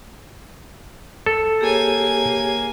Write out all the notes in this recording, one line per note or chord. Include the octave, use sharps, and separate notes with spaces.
A4
A#3 G4 G#4 C#5 G#5